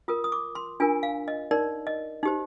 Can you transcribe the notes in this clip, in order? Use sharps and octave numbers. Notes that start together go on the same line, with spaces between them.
F4 A#4 D#6
D#6
D6
C6
D4 F4 A#4 G#5
F5
D#5
D#4 A#4 D5
D#5
D#4 G4 C5